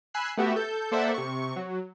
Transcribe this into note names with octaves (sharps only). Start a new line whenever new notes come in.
G#5 B5 E6 F#6 C7
A3 B3 F#4 G4 E5
A4 G6
A#3 A4 C5 D5 E5 F#5
C3 C#6
F#3